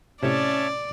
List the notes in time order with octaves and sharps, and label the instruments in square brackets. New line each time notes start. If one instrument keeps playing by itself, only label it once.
[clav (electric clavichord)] A2 C3 [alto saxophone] C#4 [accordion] C#5 E5 A5 [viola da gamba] D5